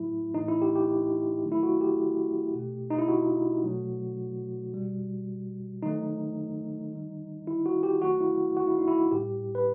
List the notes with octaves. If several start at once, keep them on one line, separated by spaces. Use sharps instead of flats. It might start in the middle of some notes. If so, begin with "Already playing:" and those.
Already playing: A2 F#3 A3 E4
A2 E3 A3 D#4
E4
G4
G4
D#3 F#3 A3
E4
F#4
G4
B2 A3
D#4
E4
F#4
B2 F#3 A3
B2 G3
D#3 F#3 A3 D#4
D#3 G3
E4
F#4
G4
D#3 F#3 A3 F#4
E4
F#4
E4
D#4
E4
A2 G3 G4
B4